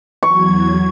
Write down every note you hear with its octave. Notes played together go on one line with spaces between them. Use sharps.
E2 F#3 C#6 G#6